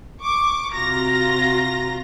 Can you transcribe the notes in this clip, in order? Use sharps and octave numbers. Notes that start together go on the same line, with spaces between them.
C#6 D6
C3 F4 F#4 A#5 A#6